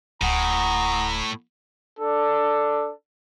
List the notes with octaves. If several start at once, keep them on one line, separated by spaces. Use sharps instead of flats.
D1 A2 F#5 G#5 A#5 D#6
D4 A4